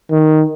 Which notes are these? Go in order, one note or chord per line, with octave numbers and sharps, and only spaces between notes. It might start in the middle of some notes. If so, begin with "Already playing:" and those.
D#3